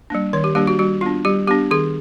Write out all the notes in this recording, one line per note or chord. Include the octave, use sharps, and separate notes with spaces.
G3 A#3 D4
D#3 C#5
G4
G3 A#3 D4 G4
F#4
G3 F#4
B3 D4 F4
G3 G4
B3 D4 G4
D#3 G#4